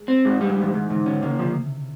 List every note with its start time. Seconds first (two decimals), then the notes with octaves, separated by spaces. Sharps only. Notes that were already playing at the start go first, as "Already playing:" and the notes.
Already playing: G#3
0.08 C4
0.25 G#2
0.37 F#3 G3
0.49 F3
0.58 G#2 E3
0.73 G#2 D#3
0.90 G#2 D3
1.06 D3 C#4
1.23 C#3 A#3
1.39 C3 F3